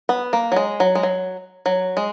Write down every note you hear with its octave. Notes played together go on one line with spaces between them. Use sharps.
B3
A#3
F#3
G#3
F#3
G#3
F#3
F#3
G#3